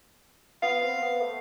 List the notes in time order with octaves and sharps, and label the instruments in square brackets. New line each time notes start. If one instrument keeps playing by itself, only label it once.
[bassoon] B3 [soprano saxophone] F5
[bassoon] C4
B3
A3